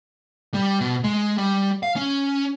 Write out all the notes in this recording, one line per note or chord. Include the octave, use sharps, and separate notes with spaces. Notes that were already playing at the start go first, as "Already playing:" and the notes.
G3
B2
G#3
G3
F5
C#4